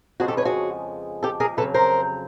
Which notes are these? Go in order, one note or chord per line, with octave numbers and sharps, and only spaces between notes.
F2 C#3 F3 G#3 F#4 G#4
G4 A4
B4 C#5
F#4 G#4
G4 A4
G#4 A#4
F2 C#3 F#3 A4 B4
A#4 C5